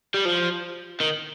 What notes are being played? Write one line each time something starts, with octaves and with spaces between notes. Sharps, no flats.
G3
F3
D#3